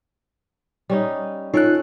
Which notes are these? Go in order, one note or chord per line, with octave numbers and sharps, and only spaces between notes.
G3 C#4 D#4
C#4 D#4 F4 A4 F#6